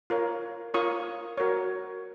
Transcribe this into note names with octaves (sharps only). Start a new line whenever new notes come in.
F4 A#4 C#5
F4 A#4 C#5 C#6 D#6
F#4 A#4 C#5